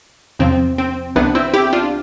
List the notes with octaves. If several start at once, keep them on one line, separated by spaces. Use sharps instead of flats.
E2 C3 F3 C4
C4
C2 C3 E3 B3 D4
C4 E4
E4 G4
D4 F4